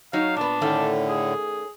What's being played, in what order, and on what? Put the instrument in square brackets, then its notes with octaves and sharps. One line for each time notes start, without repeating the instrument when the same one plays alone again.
[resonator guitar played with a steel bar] F#3 D#4 C#5 [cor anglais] F5
[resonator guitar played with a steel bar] A#2 B3 [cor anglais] D4
[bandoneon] A2 D3 [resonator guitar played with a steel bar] D#3 A3 C#4
[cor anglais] G#4